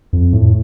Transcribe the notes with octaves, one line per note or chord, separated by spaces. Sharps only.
F2
A2